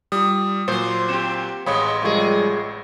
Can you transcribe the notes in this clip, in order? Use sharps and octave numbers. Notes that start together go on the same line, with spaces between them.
G3 F4 D#6
A#2 F#3 C5
C4 G4 E7
A1 G#3 C#5 F5 B5 D#6
C3 F3 G3 G#3 G#4 A#4 F5 C#6